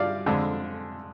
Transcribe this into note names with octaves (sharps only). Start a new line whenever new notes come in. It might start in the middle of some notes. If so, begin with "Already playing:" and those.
Already playing: G2 G3 D5 F5
F2 D3 G#3 D4